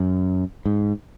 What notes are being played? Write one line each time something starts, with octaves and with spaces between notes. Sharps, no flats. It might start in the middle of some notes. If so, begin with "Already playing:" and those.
Already playing: F#2
G#2